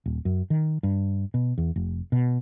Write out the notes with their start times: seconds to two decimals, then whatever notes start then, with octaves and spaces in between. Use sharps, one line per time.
0.06 D#1
0.25 F#2
0.50 D#3
0.83 G2
1.34 B2
1.58 E2
1.76 F1
2.12 B2